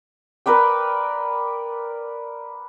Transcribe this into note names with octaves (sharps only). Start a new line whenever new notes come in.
A#4 B4 D5 G5